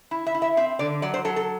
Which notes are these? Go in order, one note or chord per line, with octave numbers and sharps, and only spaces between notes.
E4
E5
E4
E5
C4 E5
D3 D5
F#3 D5
C5
F#3 A4
A4